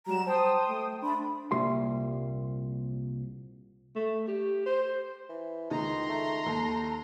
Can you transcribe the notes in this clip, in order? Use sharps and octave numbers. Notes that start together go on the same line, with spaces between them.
F#3 G3 A#5 E7
C5 G5 A5 D#6
A3
A3 D4 B5 C6
C2 A#2 G3 C6
A3
G4
C5
E3
C#2 D#3 D#4 A#5 C6
A3
D#2 A4